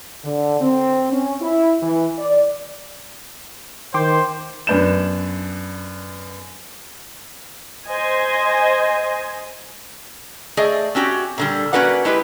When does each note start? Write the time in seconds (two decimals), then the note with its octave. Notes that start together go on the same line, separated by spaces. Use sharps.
0.24 D3
0.61 C4
1.13 C#4
1.41 E4
1.82 E3
2.19 D5
3.94 D#3 C5 G5 C6 D6
4.67 F#2 B3 D4 G6 E7
7.87 C5 D#5 G#5
10.57 A3 G#4 D5 D#5
10.95 C4 C#4 F#4 G4
11.38 A#2 D3 G3
11.73 A#3 C#4 F#4 B4 D5 F#5
12.05 G#3 E4 G4 B4